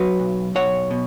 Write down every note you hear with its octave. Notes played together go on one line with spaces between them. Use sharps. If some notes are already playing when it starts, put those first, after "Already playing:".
Already playing: F#3 F#4 B4
B1
B1 C#5 F#5
B2